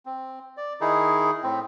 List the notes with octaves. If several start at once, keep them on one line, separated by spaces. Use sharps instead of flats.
C4
D5
D#3 D#4 E4 G#4
A2 C4